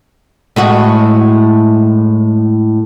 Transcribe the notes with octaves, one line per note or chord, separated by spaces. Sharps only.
A2 G#3 F#4